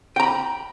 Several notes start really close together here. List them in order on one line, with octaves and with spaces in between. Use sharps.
G5 A#5 B5